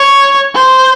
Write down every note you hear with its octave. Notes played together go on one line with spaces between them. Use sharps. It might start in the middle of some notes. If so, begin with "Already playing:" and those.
Already playing: C#5
C5